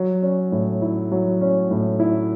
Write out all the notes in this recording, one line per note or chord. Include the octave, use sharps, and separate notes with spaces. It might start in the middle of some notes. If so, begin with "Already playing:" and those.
Already playing: F#3
C#4
A2
E4
F#3
C#4
A2
E4